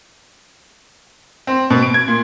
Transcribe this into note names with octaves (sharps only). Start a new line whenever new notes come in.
C4
B2
D7
G#6
A#2